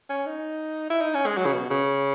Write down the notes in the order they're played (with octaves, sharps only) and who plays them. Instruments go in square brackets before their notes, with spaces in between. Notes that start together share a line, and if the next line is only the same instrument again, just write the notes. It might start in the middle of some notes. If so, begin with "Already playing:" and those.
[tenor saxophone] C#4
D#4
E4
D#4
C#4
G#3
F#3
C#3
B2
C#3